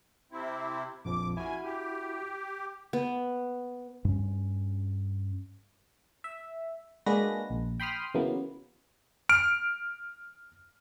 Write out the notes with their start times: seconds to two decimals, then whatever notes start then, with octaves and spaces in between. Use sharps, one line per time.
0.32 C3 C4 E4
1.05 A#1 F2 F3 D6
1.37 E4 F#4 G#5
1.65 G4
2.93 B3
4.05 G2 C#4
6.24 E5
7.06 G#3 A#3 D4 F#4 B4 A#6
7.50 A#1
7.80 G5 B5 C6 D#6 F6
8.14 C#3 E3 F#3 A#3 B3
9.29 F6 D7